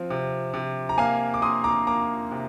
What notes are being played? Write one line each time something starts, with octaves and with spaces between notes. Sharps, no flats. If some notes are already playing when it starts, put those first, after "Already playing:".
Already playing: F3 C4
C3
C3
A#5
A#3 F5 G#5
D6
A#3 C6 D#6
A#5 D6
A#3 A#5 D6
C3